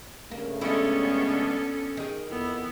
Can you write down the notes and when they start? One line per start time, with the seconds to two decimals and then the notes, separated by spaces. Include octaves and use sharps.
0.31 G2 C#3 A3 A#3
0.61 G#3 B3 C#4 D4 E4 A4
1.97 D#3 G#4
2.28 F2 B3 E4